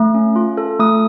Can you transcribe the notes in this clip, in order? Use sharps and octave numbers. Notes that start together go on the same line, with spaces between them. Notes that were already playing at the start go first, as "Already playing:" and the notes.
Already playing: A3
C#4
F4
A4
A3 D#6